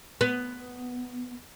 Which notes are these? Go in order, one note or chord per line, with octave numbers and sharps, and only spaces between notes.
B3